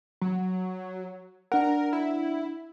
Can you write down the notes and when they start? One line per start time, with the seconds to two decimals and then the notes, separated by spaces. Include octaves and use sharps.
0.22 F#3
1.52 D4 A#4 F#5
1.93 E4